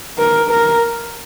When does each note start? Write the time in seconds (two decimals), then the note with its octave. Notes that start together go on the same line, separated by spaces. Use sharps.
0.19 A#4
0.51 A#4